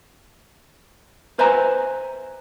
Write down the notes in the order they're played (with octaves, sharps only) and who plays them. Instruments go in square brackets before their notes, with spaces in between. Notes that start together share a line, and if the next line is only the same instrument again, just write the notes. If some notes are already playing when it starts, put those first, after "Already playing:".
[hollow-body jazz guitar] B4 C5 E5 G#5 A#5